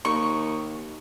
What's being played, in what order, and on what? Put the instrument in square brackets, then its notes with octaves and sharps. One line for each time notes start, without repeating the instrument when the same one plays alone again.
[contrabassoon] D#2 [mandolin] C#6